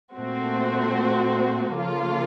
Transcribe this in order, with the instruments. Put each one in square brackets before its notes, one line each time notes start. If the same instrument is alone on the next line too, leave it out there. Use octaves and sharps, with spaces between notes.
[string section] A#2 A3 C4 F#4 C5
C#3 F3 A#3 F4 A4